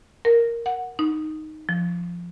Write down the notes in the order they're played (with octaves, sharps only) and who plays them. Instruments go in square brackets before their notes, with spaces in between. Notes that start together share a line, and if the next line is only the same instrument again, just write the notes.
[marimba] A#4
F#5
D#4
F3